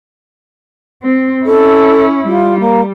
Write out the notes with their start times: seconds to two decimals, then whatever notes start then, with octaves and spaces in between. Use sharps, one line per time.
1.02 C4
1.45 C#4 E4 A4
2.27 G3 F4
2.59 A#3